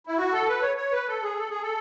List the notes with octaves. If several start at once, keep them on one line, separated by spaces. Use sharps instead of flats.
E4
F#4
A4
B4
C#5
C#5
B4
A4
G#4
A4
G#4
A4